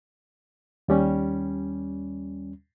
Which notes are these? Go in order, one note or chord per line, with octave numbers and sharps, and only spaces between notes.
D#2 G3 C#4